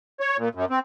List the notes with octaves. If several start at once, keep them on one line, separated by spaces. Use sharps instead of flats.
C#5
A#2
F#2
C4